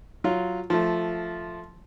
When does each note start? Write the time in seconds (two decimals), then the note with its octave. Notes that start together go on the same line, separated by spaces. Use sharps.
0.24 F#3 F4
0.70 F3 A3